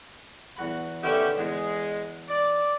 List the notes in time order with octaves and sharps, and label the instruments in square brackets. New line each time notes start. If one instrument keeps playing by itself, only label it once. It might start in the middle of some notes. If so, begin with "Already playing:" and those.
[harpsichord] E2 F#4 B5
[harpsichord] D3 D#3 B3 [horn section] C#4 G4 E5
[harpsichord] E2 [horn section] G#3
[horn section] D5